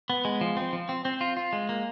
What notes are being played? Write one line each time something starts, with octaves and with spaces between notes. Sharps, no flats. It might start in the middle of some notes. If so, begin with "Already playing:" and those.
B3
G#3
F3
C4
F3
C4
C4
F4
F4
G#3
A#3